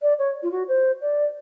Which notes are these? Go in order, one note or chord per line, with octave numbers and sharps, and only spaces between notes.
D5
C#5
F4
F#4
C5
D5